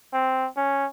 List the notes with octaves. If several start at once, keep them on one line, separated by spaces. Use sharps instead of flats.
C4
C#4